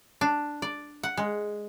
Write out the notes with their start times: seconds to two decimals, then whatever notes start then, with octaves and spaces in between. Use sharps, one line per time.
0.21 D4
0.62 D5
1.03 F#5
1.17 G#3